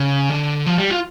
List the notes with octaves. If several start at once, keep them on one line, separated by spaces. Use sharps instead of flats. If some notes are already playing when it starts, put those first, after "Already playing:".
Already playing: C#3
D3
F3
G3
F4